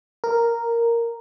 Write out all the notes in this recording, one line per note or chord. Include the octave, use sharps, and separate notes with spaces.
A#4